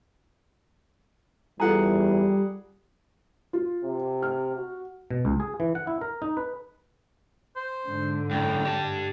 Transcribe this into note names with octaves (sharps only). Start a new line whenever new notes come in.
E2 G3 F4 G#4 A4 F#5 A#5
F4
C3
F6
F#4
B2
C#2
G#4
E3
F#5
E4
A#4
D#4
B4
C5
G#2 D3
F#2 A2 G5
G4 A5